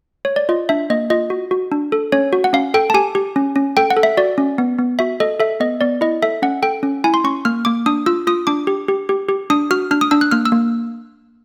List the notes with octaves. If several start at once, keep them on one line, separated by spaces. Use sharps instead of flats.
C#5
D5
F4 D#5
D4 E5
A#3 D#5
F4 D#5
F#4
F#4
D4
A4
C#4 C#5
F#4
F#5
C#4 F5
A4 G5
A5
G4 G#5
G4
C#4
C#4
A4 G5
F#5
A4
E5
F#4 D5
C#4
B3
B3
F#4 E5
A4 D#5
A4 E5
B3 D#5
B3 D5
E4 D#5
A4 E5
C#4 F#5
A4 G5
C#4
E4 G#5
C6
C#4 C#6
A#3 F6
A#3 D6
D4 D#6
F4 E6
F4 D#6
D4 D6
G4
G4
G4
G4
D4 D#6
F#4 F6
D4 F6
D#6
D4 E6
F#6
A#3 F6
E6
A#3